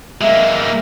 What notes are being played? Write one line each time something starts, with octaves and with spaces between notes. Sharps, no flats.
G#3 A#3 E5